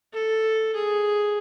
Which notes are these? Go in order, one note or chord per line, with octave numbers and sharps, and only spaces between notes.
A4
G#4